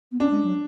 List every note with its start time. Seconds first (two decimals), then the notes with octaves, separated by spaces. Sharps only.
0.12 B3
0.20 C#4 D4
0.31 G#3
0.43 F#3